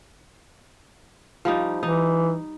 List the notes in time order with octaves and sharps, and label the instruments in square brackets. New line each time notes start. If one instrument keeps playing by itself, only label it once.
[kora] F3 G3 D#4
[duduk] E3 [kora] D#4